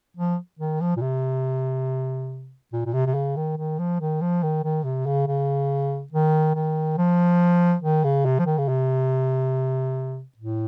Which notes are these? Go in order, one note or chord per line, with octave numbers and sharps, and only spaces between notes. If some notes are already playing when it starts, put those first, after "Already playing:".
F3
D#3
F3
A#2
C3
A#2
A#2
C3
C3
C#3
D#3
D#3
F3
D#3
F3
D#3
D#3
C3
C#3
C#3
D#3
D#3
F3
D#3
C#3
C3
F3
D#3
C#3
C3
A2